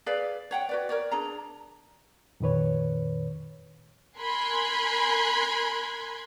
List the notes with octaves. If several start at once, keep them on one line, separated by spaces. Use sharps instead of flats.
G#4 B4 D5 F5
C#5 F#5 G5
F#4 B4 D5
A#4 C#5 D5
D4 G#4 A#5
F2 A#2 D#3 B4 C#5
A#4 G#5 B5 C6 F#6 G#6